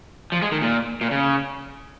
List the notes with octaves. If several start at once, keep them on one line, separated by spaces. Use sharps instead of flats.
F3
G#3
D#3
A#2
A#2
C#3